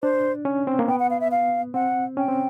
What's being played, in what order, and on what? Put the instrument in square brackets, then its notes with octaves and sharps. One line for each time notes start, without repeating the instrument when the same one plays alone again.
[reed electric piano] D4 [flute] C5
[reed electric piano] C#4
C4
A#3
[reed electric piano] B3 [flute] G5
[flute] F#5
F5
E5
F5
[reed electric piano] C4 [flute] F#5
[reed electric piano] C#4 [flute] G5
[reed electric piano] C4